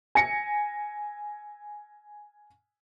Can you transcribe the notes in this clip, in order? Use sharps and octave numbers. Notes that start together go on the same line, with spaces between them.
G#5 A#6 C#7